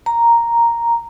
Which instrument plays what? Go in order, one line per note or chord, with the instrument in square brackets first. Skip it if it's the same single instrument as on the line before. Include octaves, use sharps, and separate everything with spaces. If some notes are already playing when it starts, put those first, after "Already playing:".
[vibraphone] A#5